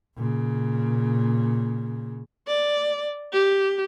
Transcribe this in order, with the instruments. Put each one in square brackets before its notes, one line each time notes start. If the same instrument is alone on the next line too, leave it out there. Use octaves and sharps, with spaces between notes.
[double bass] A#2 C#3
[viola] D5
G4